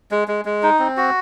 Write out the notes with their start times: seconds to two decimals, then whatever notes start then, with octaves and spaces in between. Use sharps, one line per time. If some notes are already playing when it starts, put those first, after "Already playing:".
0.11 G#3
0.28 G#3
0.45 G#3
0.63 D#4
0.79 C4
0.97 F#4